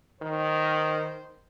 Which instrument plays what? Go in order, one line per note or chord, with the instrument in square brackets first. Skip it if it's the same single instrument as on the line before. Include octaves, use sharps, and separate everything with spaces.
[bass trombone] D#3 [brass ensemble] C5